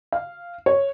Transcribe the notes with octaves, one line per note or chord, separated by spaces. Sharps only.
F5
C#5